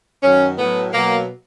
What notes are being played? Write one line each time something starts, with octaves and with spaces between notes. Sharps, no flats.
F#2 D#3 F#3 C#4
A2 F#3 B3
B2 F#3 A#3